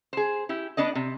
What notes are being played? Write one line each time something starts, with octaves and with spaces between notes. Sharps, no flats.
G#4 C5
E4 G4
B3 D4 D5 D#5
C3